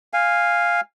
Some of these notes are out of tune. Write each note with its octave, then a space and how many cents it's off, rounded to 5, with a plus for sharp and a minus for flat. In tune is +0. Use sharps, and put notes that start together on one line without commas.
F5 +0 G#5 -20